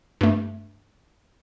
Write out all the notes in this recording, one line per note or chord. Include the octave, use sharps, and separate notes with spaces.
G2 A3